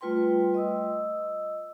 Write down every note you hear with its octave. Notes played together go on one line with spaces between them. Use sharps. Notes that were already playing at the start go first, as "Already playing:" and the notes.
G3 A3 F4 B4 G5 C6
D#5 D#6 E6